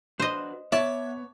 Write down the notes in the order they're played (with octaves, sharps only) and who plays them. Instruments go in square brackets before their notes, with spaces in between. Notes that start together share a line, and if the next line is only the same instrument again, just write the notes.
[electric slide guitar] D4 F#4 B4 [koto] C5 D#5
[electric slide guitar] B3 [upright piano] C#5 [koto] D5 A5 [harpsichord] E5